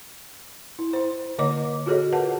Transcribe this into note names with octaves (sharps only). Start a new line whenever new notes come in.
E4
E4 C5
D3 A#3 C#5 D#5 A#5 D6
F4 F#4 G#4 A4 C#5 D#5
A#4 B4 F#5 A5